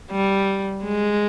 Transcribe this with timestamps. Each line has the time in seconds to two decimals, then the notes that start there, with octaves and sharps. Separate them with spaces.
0.11 G3
0.83 G#3